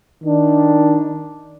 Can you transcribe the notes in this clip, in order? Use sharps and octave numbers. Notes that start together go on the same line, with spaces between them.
D#3 D4